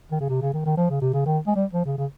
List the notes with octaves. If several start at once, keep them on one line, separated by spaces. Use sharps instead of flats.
D#3
C#3
C3
C#3
D#3
D#3
F3
C#3
C3
C#3
D#3
G#3
G3
F3
C#3
C#3